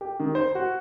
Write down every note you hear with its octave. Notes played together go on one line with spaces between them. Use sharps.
G4
D#3
C5
F#4